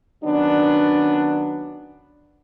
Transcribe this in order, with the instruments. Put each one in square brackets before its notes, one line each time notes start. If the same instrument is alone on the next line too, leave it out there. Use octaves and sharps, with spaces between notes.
[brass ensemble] D#3 F#3 B3 C#4 D4